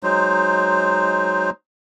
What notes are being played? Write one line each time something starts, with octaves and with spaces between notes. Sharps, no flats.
F#3 G#3 D#4 C5